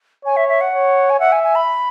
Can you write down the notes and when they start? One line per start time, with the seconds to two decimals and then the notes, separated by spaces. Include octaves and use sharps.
0.25 C#5 G#5
0.36 E5
0.48 E5
0.61 F#5
0.73 C#5
1.10 G#5
1.20 E5 F#5
1.32 G#5
1.43 G#5
1.55 B5